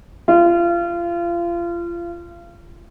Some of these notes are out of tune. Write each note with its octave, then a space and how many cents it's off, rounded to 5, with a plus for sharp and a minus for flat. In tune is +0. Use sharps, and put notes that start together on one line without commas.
F4 -30